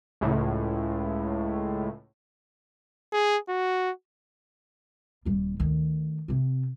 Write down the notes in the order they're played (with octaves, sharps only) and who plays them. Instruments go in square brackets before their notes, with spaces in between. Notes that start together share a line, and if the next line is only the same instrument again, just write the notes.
[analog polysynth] C#2 A2
[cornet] G#4
F#4
[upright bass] D#1 G3
D2 D#3
C3 C4